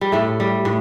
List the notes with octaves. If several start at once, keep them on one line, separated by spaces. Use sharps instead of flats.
G3
A2 A3
G3
A2